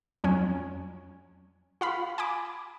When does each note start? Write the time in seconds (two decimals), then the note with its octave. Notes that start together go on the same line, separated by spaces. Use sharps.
0.24 F2 F#3 C#4
1.81 F4 F5 B5
2.18 G#5 B5 D6